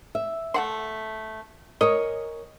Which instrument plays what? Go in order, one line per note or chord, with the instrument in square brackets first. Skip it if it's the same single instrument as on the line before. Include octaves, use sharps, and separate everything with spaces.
[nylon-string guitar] E5
[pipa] A3 F#5 C6
[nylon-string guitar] A#4 C#5 G#5 [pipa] D#5